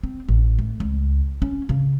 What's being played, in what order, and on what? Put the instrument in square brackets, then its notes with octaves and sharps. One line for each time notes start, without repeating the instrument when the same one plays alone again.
[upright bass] C4
A1
A3
C#2
C#4
C#3